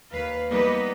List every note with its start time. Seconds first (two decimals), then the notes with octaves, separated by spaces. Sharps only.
0.10 D#2 B4 F5
0.50 G3 A#3 B3 D#4 B4 D#5